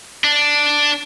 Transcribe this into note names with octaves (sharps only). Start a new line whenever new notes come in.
D4